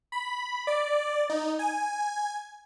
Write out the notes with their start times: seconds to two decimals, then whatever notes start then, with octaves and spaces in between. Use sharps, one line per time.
0.12 B5
0.67 D5
1.30 D#4
1.59 G#5